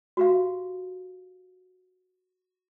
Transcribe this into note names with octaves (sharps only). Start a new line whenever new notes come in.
F#4 G4 F5